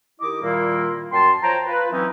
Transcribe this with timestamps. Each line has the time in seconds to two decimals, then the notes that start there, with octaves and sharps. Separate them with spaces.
0.21 D#3 E4 G4 D#5 D6
0.43 A#2 D#3 G3 A#3 E4 F4
1.12 F#2 G5 A5 C6
1.43 F3 C#5 G5 A5 A#5
1.67 F4 B4
1.91 E3 F#3 C4 C#4 D#4 E4